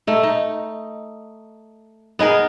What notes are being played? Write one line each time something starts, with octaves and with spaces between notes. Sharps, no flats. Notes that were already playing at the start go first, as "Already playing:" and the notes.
A3 D#4
D#4
B3 D#4 G#4 A#4